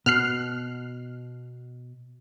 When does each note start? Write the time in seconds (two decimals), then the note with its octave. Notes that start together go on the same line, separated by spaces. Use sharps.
0.06 B2 F6 F#6 C7